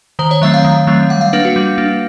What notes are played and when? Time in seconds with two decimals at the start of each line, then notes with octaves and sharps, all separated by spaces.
0.19 D#3 C5
0.31 C#5
0.42 F#3 A3 C4 E5
0.54 F5
0.65 D#3
0.87 F#3 A3 C4
1.10 G3 F#5
1.21 F5
1.33 A#3 D4 B4
1.45 F#4
1.56 G3
1.78 A#3 D4